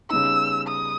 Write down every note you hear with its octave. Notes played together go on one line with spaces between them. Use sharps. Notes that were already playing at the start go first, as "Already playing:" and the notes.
C#3 G3 B3 D#4 E6
D#6